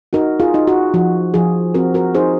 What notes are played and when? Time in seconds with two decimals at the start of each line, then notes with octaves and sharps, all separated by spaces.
0.13 D#4 F#4 A#4
0.40 F4 G#4
0.54 D#4
0.67 F#4
0.94 F3 F#4
1.34 F3 F4 G#4
1.74 C4 F#4 A#4
1.94 F#4 A#4
2.15 D#4 G#4 C5